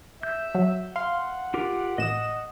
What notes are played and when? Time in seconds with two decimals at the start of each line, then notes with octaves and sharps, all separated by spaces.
0.23 E5 G6
0.55 F#3
0.96 F5 F#5 C6
1.54 F4 G4 A#4
1.98 A1 D#5 D#6 E7